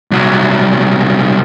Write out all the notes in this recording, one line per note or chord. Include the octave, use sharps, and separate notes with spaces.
C2 F#3